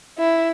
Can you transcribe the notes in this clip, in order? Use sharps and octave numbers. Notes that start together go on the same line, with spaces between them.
E4